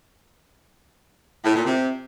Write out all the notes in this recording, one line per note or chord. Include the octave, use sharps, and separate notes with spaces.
A2
A#2
C3